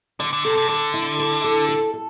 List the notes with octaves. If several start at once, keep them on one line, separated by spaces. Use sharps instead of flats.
D3 D5
D3
C3 A4
C3
D3 A4
E4
A4
A4
A4
A4